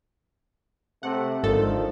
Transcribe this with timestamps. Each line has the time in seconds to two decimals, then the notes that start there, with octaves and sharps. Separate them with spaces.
1.03 C3 A3 F#5
1.43 G#1 D3 D#3 F3 A4